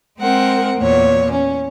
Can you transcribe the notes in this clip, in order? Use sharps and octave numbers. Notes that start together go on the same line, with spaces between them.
G#3 C4 A#4 C5 F#5
E2 A#2 C#5
C#4